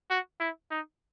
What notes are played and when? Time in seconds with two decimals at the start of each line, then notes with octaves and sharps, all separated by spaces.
0.10 F#4
0.40 E4
0.71 D#4